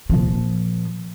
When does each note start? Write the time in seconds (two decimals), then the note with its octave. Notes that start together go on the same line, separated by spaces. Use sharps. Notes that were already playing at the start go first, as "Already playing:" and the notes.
0.10 A#2 F3